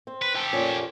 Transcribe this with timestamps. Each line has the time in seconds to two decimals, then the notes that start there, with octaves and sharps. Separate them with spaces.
0.07 C4
0.22 B4
0.35 G4 A4
0.53 F2 A#2 C#4